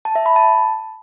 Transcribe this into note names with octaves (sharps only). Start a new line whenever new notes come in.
A5
E5
B5
A5